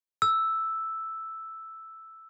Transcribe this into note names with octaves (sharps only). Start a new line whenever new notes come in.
E6